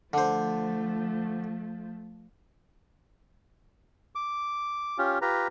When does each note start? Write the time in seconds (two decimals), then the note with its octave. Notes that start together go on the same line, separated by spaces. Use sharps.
0.13 D3 F3 A3 C5
4.15 D6
4.98 C#4 F4 G4
5.22 F4 G4 B4 A#5